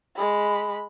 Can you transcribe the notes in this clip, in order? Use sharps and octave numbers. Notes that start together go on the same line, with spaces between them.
G#3 B5